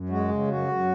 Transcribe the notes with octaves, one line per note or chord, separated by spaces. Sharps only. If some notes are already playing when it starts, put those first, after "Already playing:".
Already playing: F#2
G#3 F#4
C#3
F#2 F#4
F#2